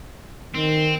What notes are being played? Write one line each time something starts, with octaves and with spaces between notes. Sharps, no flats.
D#3 C4